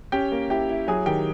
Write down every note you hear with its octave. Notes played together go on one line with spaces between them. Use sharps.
C#4 G4 G5
A#3
E4 G4 G5
E4
F#3 G#4 G#5
D#3 G4 G5